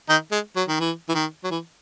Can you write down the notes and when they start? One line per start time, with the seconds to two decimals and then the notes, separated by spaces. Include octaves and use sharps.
0.09 D#3 D#4
0.32 G#3
0.56 F#3
0.68 D#3
0.80 E3
1.09 E3
1.14 D#3
1.44 F#3
1.51 E3